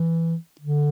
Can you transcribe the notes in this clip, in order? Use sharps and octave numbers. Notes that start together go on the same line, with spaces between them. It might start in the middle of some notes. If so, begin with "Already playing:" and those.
Already playing: E3
D3